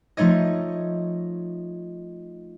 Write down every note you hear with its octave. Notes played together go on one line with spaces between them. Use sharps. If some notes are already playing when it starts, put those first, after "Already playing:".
F3 A3 D#4 C#5 D#5